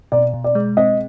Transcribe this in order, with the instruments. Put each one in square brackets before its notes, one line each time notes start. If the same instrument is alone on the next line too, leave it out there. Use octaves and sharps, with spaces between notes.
[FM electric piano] B2 [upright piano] D5
[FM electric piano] B2
[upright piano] D5
[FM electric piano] G#3
[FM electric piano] C4 [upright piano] D#5